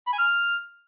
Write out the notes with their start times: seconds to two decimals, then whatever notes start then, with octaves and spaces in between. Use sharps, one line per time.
0.07 B5
0.13 G#5
0.19 F6